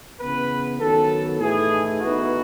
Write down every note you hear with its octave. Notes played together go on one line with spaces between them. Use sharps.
C#3 E3 B3 B4
D#3 F#3 B3 A4
A2 E3 A3 D#4 G#4
E3 B3 D#4 F#4